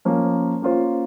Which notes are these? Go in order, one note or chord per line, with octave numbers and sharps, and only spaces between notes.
F3 A#3 C#4
A#3 C#4 F4 C5